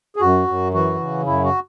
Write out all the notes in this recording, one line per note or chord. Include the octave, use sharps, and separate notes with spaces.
G#4
F#2 F#4
F#2
E3 F#4
C#3
F#2 E4
F#4